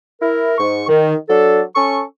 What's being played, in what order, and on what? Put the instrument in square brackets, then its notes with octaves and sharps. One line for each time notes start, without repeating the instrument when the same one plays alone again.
[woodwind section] E4 A#4
G#2 C#6
D#3
F#3 D4 A4
C#4 A4 C#6